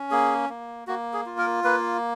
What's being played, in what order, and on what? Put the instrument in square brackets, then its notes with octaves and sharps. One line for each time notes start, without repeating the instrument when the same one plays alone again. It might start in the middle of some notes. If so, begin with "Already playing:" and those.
Already playing: [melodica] C#4
A#3 G#4
A#3
A#3 F#4
G#4
F4
A#4
A#3 B4